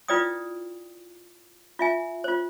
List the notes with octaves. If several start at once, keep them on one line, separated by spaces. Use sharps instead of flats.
E4 F4 B4 D5 G5 D#6
F4 E5 G#5
F4 C5